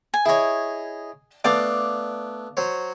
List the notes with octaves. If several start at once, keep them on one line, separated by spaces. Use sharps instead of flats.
G#5
E4 G#4 C#5 D#5
A3 B3 D4 D5 F5 D6
F#3 C5 C#5